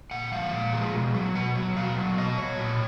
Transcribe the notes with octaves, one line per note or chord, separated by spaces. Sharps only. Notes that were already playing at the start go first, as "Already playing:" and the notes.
A#2 F#5
F3 G#3 F5
A#2
F3 G#3
B2
F#3
B2 F#5
F#3
B2 F5
F#3
B2 D#5
F#3 C#5
A#2